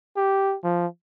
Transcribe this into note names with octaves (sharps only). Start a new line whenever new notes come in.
G4
F3